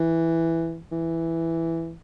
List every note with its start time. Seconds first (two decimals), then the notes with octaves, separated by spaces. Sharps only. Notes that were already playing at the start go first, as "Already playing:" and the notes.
Already playing: E3
0.92 E3